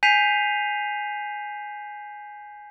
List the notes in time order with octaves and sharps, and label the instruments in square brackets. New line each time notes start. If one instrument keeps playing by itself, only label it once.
[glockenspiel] G#5 G6 B6 C7 D#7 F7